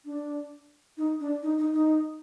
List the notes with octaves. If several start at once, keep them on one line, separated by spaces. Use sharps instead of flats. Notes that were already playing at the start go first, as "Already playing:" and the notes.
D4
D#4
D4
D#4
D#4
D#4